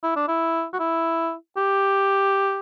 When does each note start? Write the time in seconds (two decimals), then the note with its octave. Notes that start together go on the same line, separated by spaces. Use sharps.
0.03 E4
0.16 D4
0.28 E4
0.73 F#4
0.79 E4
1.57 G4